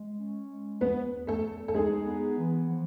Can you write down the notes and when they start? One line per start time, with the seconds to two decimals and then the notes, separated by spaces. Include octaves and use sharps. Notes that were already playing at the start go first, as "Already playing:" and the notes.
Already playing: G#3
0.18 C#4
0.49 G#3
0.80 E2 B3 B4
1.12 E2
1.27 A3 A4
1.44 E2
1.68 A4
1.74 G#3 D#4 G#4
2.07 B3
2.37 E3
2.70 F3